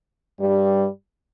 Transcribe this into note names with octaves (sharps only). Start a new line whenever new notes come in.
G2 G3